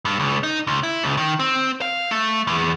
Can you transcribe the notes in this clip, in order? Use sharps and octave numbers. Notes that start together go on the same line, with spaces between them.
G2
C#2
D#4
C#2
E4
C#2
D#3
C4
F5
A3
E2